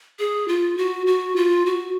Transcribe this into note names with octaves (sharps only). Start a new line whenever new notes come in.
G#4
F4
F#4
F#4
F4
F#4